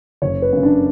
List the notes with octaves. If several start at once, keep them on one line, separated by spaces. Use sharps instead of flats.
F#1 C#5
B4
F#2 C#3
D4